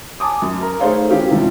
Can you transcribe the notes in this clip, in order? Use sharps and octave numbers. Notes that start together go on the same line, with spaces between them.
G#5 A5 D6 D#6
F#2
A#4 A#5
A3 D#4 G#4 C5 C#5 F5
E3 C#4 G4 F5
G#2 C3 E3 F3 G3